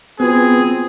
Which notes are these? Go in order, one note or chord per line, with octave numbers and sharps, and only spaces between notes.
B3 C4 F4 F#4 G#4